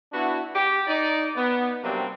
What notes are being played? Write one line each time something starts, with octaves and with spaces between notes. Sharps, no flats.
B3 D4 E4 F#4
G4
D#4 D5
B3
C3 F#3 G3 A#3 C4 D4